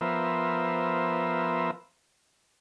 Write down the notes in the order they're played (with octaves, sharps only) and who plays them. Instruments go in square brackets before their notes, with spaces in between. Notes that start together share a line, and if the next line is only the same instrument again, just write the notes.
[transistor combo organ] F3 B3 A#4 C5 E5